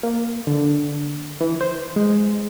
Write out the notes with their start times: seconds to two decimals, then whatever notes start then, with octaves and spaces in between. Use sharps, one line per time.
0.03 A#3
0.47 D3
1.41 E3
1.61 C5
1.96 G#3